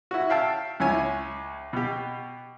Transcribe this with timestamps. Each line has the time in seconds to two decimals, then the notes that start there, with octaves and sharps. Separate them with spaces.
0.11 E4 F#4
0.29 E5 F5 G5 A5 E6
0.80 C#2 E4 C#5 G#5
1.73 B2 G4